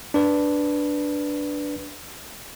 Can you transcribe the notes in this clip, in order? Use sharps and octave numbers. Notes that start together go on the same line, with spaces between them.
D4 B4